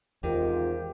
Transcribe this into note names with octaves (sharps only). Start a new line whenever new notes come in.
E2 G#2 C3 D#3 F4 G4